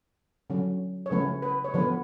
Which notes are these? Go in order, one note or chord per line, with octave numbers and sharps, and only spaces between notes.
D3 F#3 C#4
C#5
C#3 F3 A3 C#4 B4
B4
C#5
D3 F3 B3 B4